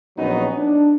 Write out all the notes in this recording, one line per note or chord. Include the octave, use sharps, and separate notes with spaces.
A#1 F#3 B3 C#4 D#4
D4